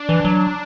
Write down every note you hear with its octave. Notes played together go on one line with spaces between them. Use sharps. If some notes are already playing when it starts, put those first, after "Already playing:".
Already playing: D4
E3
F#3